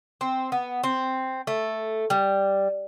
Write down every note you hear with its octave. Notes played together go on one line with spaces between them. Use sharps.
C4
B3
C4
A3
G3